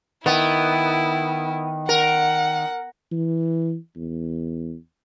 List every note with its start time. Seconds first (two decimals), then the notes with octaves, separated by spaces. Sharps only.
0.26 D#3 B3 E4
1.89 A#4 F#5
3.12 E3
3.96 E2